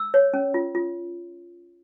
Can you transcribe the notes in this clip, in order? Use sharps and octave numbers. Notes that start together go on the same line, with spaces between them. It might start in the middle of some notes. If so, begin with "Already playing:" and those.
Already playing: E6
C#5
C#4
F4
F4